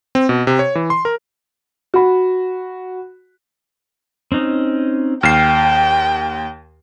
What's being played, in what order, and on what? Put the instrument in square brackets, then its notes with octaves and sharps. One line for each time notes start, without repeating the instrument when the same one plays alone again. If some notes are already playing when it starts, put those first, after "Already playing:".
[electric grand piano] C4
B2
C3
C#5
E3
C6
A#4
[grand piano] F#4 B5
[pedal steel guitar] C4 C#4 D#4
[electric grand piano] D#2 C7 [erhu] G5 [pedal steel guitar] A5 F6